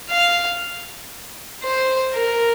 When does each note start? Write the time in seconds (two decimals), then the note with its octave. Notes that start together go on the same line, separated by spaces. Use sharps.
0.10 F5
1.64 C5
2.14 A#4